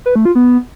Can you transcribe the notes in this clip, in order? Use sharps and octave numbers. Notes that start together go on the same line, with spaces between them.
B4
A3
F4
B3